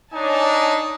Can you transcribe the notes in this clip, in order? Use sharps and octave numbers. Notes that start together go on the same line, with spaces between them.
D4 D#4 C#5 G#5 A5